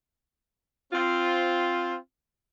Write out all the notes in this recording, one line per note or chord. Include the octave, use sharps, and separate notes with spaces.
C4 F4